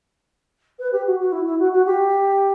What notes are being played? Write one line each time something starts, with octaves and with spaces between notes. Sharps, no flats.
B4
G4
F#4
F#4
E4
E4
F#4
F#4
G4